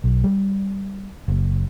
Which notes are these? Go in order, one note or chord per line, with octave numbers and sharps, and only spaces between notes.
B1
G3
F#1